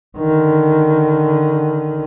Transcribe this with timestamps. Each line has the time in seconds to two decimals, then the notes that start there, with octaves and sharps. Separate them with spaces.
0.18 D3 D#3